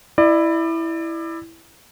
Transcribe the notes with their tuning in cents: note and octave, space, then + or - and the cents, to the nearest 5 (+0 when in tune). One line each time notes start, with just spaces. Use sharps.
E4 +0 D5 +30